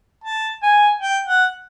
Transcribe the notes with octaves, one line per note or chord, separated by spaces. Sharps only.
A5
G#5
G5
F#5